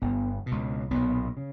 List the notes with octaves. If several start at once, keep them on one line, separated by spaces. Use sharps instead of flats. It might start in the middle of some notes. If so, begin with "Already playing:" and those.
G1 G2 B3
B2
C#2
B1 A#2 B3
C#3